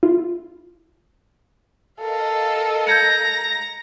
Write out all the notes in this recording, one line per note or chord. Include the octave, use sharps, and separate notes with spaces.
E4 F4
A4 A#4 D#5 F5
A#5 G6 G#6 C#7